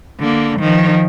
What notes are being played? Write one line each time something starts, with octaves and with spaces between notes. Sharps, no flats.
D3 A#3
D#3 F3